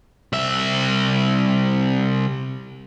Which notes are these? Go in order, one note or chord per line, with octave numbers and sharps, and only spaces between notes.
C2 E5